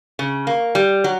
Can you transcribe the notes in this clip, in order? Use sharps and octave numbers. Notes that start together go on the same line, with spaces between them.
C#3
A#3
G3
F#3